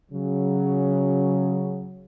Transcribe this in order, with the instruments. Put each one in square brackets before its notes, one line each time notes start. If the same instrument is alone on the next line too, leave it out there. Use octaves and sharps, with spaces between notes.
[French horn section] C#3 F#3